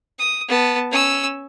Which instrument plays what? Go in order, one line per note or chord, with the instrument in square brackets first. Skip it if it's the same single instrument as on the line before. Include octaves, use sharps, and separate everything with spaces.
[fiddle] D#6
B3 A5
C#4 E6